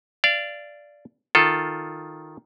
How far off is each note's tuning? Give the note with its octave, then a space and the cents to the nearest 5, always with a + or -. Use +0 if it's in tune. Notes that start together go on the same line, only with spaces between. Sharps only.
D5 +0 F5 -25
D#3 +0 F4 +0 A4 +0